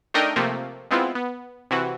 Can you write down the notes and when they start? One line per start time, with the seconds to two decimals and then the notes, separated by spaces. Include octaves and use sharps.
0.14 A3 D4 D#4 A#4 D#5 G5
0.36 C3 F3 A3 A#3
0.91 G#3 B3 C4 E4 F4
1.15 B3
1.71 C3 E3 F#4